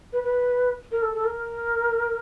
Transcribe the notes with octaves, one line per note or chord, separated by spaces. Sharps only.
B4
B4
A#4
A4
A4
A#4